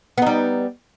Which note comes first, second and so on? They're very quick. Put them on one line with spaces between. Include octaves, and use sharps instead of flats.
B3 D#4 G3